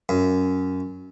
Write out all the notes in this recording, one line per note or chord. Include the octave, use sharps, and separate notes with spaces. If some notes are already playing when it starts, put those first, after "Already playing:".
F#2